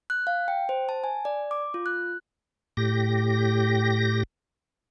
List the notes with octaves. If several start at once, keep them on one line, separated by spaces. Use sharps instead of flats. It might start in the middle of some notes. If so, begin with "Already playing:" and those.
F#6
F5
G5
C5
A5
G#5
D5
D6
F4
F#6
A2 G4 A#6